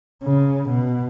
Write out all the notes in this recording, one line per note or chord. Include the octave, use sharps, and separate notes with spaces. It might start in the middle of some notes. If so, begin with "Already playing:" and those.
C#3
B2